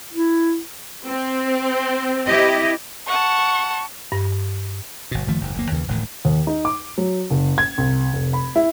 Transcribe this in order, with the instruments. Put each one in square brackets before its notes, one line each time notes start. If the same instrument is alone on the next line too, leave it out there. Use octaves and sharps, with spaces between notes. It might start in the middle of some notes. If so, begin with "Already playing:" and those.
[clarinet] E4
[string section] C4
[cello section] E4 G4 D#5
[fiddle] F#5 A5 [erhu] C#6
[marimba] G2
[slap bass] G1 B2
F#1 D#3 F3 A3
F#1 D#2 G#2
F#1 D2 A#3
D#2 C#3 E3
E1 D2 A2 D#3
[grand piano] D#2
D#4
D6
F#3
F#1
G#6
C2
F1
B5
E4